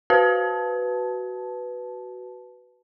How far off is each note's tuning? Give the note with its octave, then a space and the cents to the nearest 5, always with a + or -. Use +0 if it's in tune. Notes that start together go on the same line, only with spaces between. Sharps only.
F#4 +10 B4 +0 A5 -10